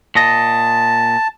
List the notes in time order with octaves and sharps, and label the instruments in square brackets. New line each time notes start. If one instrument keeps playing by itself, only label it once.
[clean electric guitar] A#2 D#5 [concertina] A5